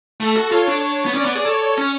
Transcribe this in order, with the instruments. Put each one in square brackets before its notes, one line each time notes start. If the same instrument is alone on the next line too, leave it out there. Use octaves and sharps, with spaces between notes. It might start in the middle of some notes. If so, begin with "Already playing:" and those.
[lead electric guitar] A3 [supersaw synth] A4
[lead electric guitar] F#4
[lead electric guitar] F4 [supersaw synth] C#5
[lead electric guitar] D4
B3
[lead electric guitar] C#4 [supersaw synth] D5
[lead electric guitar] B3
G#4
[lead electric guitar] A4 [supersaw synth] C#5
[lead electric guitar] C#4